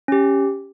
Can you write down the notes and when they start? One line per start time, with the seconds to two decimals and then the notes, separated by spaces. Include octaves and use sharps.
0.08 C#4 G4